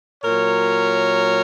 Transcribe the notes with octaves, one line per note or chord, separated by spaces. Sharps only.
A#2 F#3 A#4 C#5